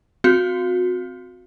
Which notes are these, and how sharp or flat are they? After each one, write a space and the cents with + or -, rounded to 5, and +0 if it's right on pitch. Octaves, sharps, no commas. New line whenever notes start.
C4 -20 F#4 -25 F5 -10